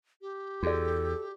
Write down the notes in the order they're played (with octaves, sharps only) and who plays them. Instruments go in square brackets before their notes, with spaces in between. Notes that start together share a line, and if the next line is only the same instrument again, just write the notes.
[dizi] G4
[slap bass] E2 [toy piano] F#4 G#4 D5 [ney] A4